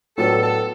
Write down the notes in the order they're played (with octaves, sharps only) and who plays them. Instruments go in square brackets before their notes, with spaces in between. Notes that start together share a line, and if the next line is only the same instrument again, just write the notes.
[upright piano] A2 F#3 B3 D4 [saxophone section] A4
[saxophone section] A4